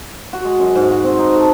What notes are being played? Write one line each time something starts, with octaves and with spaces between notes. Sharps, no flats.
F#4
G#3
F#2
G#2
F#4
C4
D#4
A4